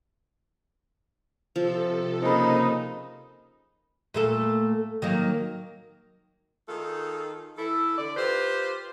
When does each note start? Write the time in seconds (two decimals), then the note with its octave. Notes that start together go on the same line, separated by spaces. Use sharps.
1.56 C3 F3 A4
2.22 C#3 A#3 D#4 C5 B5
4.14 A#2 A3 A4
5.02 D#3 F#3 A#3
6.69 D#3 D#4 F4 G#4 A4
7.58 E3 E4 A4
7.98 D3 D5
8.17 F4 G4 B4 C5